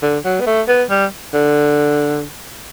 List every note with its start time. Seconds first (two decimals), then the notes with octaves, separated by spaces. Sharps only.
0.02 D3
0.25 F#3
0.40 B3
0.47 A3
0.68 B3
0.90 G3
1.34 D3